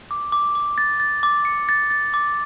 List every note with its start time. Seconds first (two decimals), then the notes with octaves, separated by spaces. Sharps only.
0.11 D6
0.32 D6
0.55 D6
0.78 A6
1.00 A6
1.23 D6
1.45 C#7
1.69 A6
1.90 A6
2.14 D6